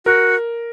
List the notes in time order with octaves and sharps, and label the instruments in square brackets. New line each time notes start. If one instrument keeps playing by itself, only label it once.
[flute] F#4 [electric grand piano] A#4